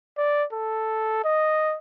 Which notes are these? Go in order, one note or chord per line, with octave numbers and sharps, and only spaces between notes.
D5
A4
D#5